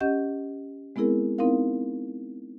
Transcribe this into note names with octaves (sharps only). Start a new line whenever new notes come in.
C#4 G4 D#5 F#5 G6
G#3 B3 C4 E4 G#4 A#4
B3 C4 D#4 E4 A#4 F5